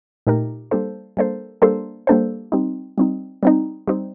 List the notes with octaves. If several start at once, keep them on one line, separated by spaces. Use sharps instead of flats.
A#2 A3 D#4 G4 A#4
G3 A#3 D4 A4 C5
G3 A#3 D4 A4 C5
G3 A#3 D4 A4 C5
G3 A#3 D4 A4 C5
G3 C4 D#4
G3 C4 D#4
G3 C4 D#4
G3 C4 D#4